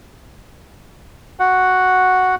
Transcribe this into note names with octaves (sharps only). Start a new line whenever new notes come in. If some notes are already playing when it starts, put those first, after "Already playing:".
F#4 F#5